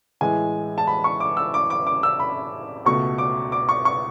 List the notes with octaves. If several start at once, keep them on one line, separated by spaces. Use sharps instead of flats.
A2 E3 G#3 G#5
A5
B5
C#6
D6
E6
D6
D6
D6
E6
B5
C#2 B2 A3 C#6
D6
D6
C#6
C#6